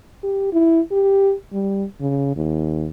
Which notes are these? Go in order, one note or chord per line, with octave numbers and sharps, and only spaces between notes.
G4
E4
G4
G3
C#3
D#2